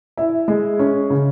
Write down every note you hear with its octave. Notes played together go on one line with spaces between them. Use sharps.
E4
G#3
C#4
C#3